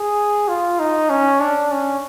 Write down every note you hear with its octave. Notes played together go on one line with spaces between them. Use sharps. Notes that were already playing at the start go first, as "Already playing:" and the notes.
Already playing: G#4
F4
D#4
C#4
D4
C#4